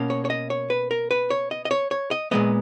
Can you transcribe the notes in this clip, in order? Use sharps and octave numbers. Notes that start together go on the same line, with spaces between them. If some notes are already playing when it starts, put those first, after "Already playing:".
Already playing: B2 A#3 C#4
C#5
C#5
D#5
C#5
B4
A#4
B4
C#5
D#5
D#5
C#5
C#5
D#5
A#2 G#3 B3 D#5